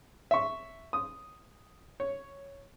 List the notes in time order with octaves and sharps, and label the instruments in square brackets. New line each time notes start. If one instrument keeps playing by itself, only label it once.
[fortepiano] E5 C#6
D#6
C#5